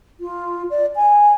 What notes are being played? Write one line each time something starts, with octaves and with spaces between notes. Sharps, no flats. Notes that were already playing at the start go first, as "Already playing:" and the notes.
F4
D5
G#5